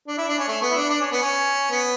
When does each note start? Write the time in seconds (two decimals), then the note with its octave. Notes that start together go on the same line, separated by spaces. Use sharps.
0.08 D4
0.18 E4
0.28 D4
0.39 C#4
0.48 A3
0.62 B3
0.71 E4
0.76 D4
0.89 D4
1.01 C#4
1.12 B3
1.22 C#4
1.71 B3